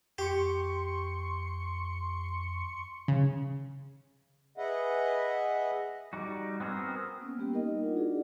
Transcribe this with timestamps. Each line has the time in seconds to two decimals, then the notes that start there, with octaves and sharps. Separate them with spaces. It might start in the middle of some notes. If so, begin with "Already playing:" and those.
0.18 F2 G4 C6 C#6 C#7
3.08 C#3
4.58 G#4 B4 D#5 E5 F#5
6.13 G3 D#4 F#4
6.60 B3 C4 F#4 G#4 A#4
7.21 A#3 B3 C#4
7.37 G3 A#3 B3 G4 G5
7.52 D#4 A#4 D#5
7.82 D4 D#4 F4 F#5
7.95 D4 E4 F#4 G#4 D5